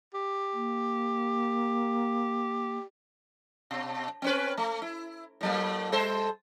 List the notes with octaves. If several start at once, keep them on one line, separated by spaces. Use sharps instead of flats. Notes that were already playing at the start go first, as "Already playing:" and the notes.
G4
A#3
B2
C4 C#4 B4
A3
E4
A2 F#3 A#3
G3 A4 C5